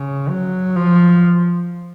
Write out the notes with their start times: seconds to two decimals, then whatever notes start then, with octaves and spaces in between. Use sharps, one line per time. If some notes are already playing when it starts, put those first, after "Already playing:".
Already playing: C#3
0.29 F#3
0.76 F3